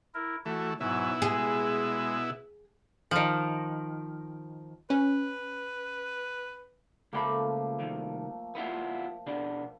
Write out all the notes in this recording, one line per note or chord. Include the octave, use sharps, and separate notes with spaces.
E4 A#4
E3 A3 F#4
G#2 B2 F#3 E4
G#3 G#4
D#3 F3
C#4 B4
C#2 F3 A3 A#3 G4 B5
C2 D#3
B3 E4 F4
B2 B3 D4